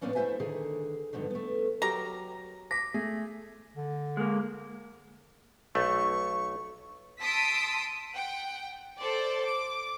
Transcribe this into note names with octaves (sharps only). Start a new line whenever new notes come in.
A2 F3 A#3 B3 C#4 D4
A3 E4 G4 C5 E5 G#5
D3 D#3 G#4
G2 B2 D3 D#3 F3
A3 B3
F#3 G4 A#4 A#5
D6 A#6 B6
A3 G#4
D3
G#3 A#3
B1 A3 C#6
A5 C6 D#6 E6 B6 D7
F#5 G5
A4 C5 D5
D6